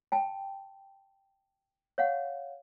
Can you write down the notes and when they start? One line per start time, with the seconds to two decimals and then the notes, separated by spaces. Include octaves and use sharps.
0.12 G5 A5
1.98 C#5 F5 F#5